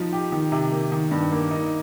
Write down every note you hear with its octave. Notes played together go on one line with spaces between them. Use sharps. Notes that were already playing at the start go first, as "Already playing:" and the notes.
Already playing: F3 D#4
G4
D#3
C3
A#3
D#3
G2
A#3
D#4